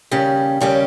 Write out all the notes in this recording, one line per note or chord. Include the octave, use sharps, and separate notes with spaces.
D#2 C#3 G3 C#4 G4
D#2 C#3 G3 C#4 G4